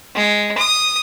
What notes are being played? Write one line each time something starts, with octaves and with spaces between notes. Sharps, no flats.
G#3
D#6